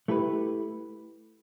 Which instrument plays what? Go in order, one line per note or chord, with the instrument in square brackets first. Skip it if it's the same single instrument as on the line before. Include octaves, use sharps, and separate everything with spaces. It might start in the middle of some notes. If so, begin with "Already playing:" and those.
[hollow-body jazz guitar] A3 E4 G4 B4